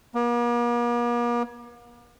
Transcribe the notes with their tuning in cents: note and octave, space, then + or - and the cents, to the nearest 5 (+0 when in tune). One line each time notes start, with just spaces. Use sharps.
A#3 +45